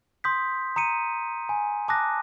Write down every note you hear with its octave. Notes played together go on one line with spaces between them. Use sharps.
C6 D#6 G6 B6
A#5 D#6 C#7 D#7
G#5
A5 D6 D#6 F#6 A#6